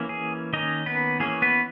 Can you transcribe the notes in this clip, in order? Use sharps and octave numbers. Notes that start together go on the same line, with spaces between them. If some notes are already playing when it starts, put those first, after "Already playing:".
Already playing: E3 A#3 C#4
G#4
D#3 A#3 C#4 D#4 D#5
B3 B4
E3 A#3 C#4 G#4
B3 B4